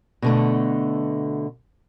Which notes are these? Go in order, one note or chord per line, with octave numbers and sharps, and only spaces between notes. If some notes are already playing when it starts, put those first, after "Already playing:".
B2 D3 A3